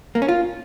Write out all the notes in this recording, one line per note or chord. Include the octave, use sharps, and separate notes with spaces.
A#3
C#4
F4